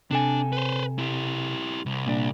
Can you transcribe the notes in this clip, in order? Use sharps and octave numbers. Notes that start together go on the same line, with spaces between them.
C3 D4 A4 G#5
B4 C5
E4 G4
C2
A#2 D4